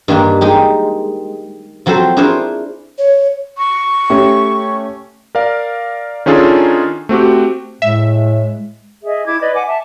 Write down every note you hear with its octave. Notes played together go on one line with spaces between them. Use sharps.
G2 D#3 A#3 D4
G#3 D#4 G4
F3 F#3 C4 A4 C5
D4 E4 G#4 A#4 C5 C#5
C#5
C#6
A3 C#4 G4
A#4 D5 F5
D#3 C#4 D4 F4 G#4 A4
A3 C4 F#4 G4
A2 G#3 E5
G#4 D#5 E5
E4 D6 G#6
B4 D5 D#5
F#5 G#5 D6
E5 A5